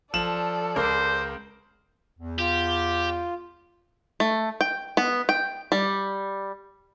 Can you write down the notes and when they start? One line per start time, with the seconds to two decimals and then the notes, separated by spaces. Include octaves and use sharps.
0.14 F3 A4 D5 E7 F#7
0.76 C#2 A#4 C5 D6
2.19 E2
2.39 F4 G4
4.20 A3
4.61 G5
4.97 B3
5.29 G5
5.72 G3